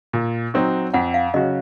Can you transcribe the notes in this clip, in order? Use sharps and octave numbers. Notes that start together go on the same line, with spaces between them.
A#2
F#3 C4 D#4 F#4
F2 F#5
F5
C#3 F#3 C#4 F#4 D#5